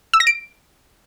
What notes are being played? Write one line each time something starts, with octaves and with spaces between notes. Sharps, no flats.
E6
A#6
D7